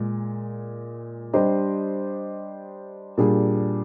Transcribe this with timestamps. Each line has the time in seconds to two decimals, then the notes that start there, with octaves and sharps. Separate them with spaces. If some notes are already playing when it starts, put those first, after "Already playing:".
Already playing: A#2 G#3
1.33 G3 D4 G4 C5 D#5
3.18 A#2 G3 D4 G#4